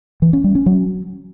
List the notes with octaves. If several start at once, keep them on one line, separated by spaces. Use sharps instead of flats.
E3
C#4
G3
C#4
F#3